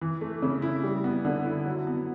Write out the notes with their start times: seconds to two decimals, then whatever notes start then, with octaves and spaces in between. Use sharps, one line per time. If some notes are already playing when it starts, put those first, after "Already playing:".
0.01 E3
0.21 A3
0.42 C#3
0.62 E4
0.83 G3
1.04 B3
1.25 D3
1.46 E4
1.66 F#3
1.87 B3